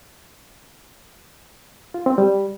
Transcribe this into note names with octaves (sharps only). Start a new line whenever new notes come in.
F4
C4
G3